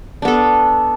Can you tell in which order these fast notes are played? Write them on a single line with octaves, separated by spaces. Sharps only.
D4 B3 A4